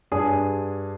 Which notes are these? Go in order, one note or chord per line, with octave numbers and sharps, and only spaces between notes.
G2 G#4 D#6